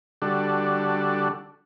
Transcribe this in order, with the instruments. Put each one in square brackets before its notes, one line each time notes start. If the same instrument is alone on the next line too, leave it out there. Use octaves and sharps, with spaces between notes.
[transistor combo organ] D3 G3 D4 F#4 A4